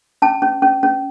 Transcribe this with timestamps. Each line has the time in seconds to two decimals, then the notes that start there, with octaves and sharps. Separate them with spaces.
0.22 C#4 A5
0.42 C#4
0.62 C#4
0.83 C#4